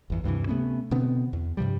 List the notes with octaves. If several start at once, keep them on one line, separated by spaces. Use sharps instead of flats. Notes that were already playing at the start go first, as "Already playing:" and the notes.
G1 E2
D2 G2 C3 E3
C3 A3 B3 C#4
B2 D3 B3 C4
E2
G2 C3 F3 G3